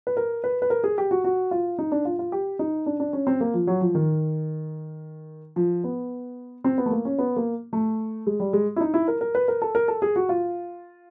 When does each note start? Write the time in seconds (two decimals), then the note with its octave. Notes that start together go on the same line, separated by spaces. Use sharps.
0.07 B4
0.17 A#4
0.44 B4
0.62 B4
0.70 A#4
0.84 G#4
0.98 G4
1.11 F#4
1.24 F#4
1.51 F4
1.79 D#4
1.92 D4
2.05 F4
2.19 F4
2.32 G4
2.59 D#4
2.86 D4
3.00 D4
3.13 C#4
3.27 C4
3.41 A#3
3.54 F3
3.67 F#3
3.81 F3
3.95 D#3
5.56 F3
5.84 B3
6.64 C4
6.78 B3
6.86 A3
6.91 A#3
7.05 C#4
7.18 B3
7.36 A#3
7.73 A3
8.27 G#3
8.40 G3
8.53 G#3
8.76 E4
8.81 D#4
8.94 E4
9.08 A#4
9.21 A#4
9.35 B4
9.48 A#4
9.62 A4
9.75 A#4
9.88 A4
10.02 G#4
10.16 F#4
10.29 F4